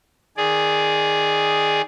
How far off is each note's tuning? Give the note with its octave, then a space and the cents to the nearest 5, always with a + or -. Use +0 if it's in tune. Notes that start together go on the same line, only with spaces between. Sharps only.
D#3 +0 G#4 +0 D5 +0